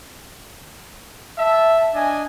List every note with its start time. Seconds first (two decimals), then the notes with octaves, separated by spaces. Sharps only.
1.38 E5 A5
1.95 D4 D#5 G#5